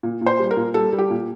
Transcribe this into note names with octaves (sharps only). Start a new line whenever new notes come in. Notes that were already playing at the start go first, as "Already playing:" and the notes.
A#2
A#2
C5
G3
A#4
A#2
G3 A4
G3
G4
A#2